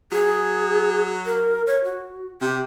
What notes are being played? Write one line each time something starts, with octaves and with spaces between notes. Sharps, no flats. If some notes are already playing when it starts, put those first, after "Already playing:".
F#3 G#4
A#4
C#5
F#4
C3 G4